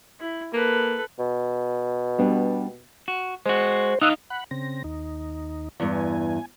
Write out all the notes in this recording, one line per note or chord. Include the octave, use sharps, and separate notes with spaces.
E4
A#3 A4 B4
B2
G3 B3 D4
F#4
G#3 F#4 C5
D#4 F5 D#6 E6 F#6
F#5 B5 F#6
C#3 C4 A#6
D#2 D#4
E2 G2
G#5